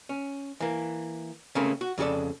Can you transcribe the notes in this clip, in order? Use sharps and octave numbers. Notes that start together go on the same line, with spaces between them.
C#4
E3 A#3
C#3 A3 A#3 C4 C#4
F#4
F2 C#3 F#4 A4 D5